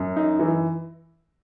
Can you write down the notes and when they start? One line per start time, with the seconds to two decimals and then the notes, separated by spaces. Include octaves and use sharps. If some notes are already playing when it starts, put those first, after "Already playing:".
Already playing: F#2
0.16 D#4
0.39 E3